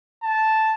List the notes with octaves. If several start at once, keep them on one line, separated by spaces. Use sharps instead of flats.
A5